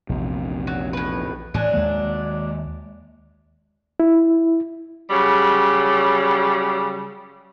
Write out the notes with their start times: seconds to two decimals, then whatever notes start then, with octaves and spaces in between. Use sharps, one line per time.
0.09 A#1 E2 C3
0.67 F#3
0.93 A2 B4
1.54 A2 E3 F#3 A3 D4 G#5
1.73 D#2 D#3 G#3 A#3
4.00 E4
5.10 C#3 F#3 G3